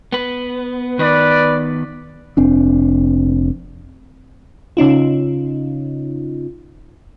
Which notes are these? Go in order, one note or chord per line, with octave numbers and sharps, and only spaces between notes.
B3 B4
D#3 B3 B4 D5
F1 C4 D4
C#3 C#4 D#4 F4